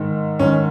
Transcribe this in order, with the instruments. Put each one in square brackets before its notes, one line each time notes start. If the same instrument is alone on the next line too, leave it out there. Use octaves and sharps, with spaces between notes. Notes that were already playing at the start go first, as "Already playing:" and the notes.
Already playing: [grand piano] G#2 D#3
G#2 D#3 C#4